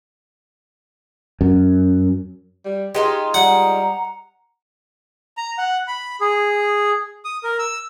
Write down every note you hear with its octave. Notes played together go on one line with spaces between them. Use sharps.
F#2
G3
G#3 D#4 F4 G4
G3 F#5 A#5
A#5
F#5
B5
G#4
D#6
A#4
E6